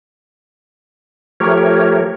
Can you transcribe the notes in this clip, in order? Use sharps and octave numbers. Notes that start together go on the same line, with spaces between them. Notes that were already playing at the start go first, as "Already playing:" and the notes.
F3 A3 G4 A#4 C#5